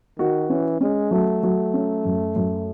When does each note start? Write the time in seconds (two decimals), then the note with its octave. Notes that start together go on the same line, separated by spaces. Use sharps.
0.19 D#3 F#4
0.50 E3 C#4
0.81 G#3 C#4
1.11 F#3 A3
1.43 F#3
1.74 C#4
2.05 F#2
2.36 F#2